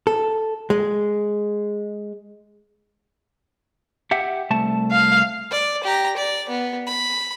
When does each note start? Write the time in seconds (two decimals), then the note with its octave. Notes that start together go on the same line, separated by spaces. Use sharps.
0.07 A4
0.70 G#3
4.11 G4 E5 F#5
4.50 C2 A3 A5
4.91 F5
5.51 D5
5.83 G4 A#5
6.17 D5
6.49 B3
6.87 B5